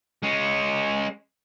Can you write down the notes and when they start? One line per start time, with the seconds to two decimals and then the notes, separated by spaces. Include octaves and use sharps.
0.23 G#3 C#4